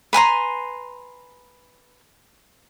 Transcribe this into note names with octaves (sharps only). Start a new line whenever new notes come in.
B4 G#5 A#5 C6